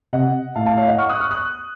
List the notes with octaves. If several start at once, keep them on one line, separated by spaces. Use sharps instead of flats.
C3 D#5 F#5
A2 F5 A5
F5 A5
C#5 F5
D#5 F#5
C#6 F6
D#6 F#6
C#6 F6
D#6 F#6